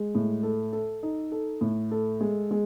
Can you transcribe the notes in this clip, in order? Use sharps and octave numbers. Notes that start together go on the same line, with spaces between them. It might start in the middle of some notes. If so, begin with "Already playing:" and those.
Already playing: G#3
A2
A4
A4
D#4
A4
A2
A4
G#3
G#3